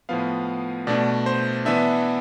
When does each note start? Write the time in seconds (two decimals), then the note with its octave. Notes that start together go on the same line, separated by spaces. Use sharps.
0.09 A2 F3 B3 F5
0.87 B2 A3 D4 D5
1.26 C5
1.65 E3 B3 D4 E5